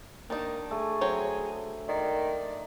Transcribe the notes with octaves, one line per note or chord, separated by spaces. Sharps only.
D#3 A#3 D4 D#4 D5 A5
A3 G#4
F#3 C4 C#5
D#3 D5